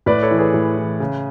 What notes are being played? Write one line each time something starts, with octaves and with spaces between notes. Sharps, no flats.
A2 B4 D5
A4 C#5
E3
G#4 B4
A2
E3
C#3